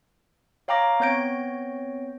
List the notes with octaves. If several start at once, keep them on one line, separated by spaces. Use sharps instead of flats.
C#5 F5 G5 A#5 D6 A#6
B3 C4 C#5 G6 A#6 D7